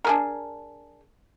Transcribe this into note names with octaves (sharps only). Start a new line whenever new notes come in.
D4 G#4 A#4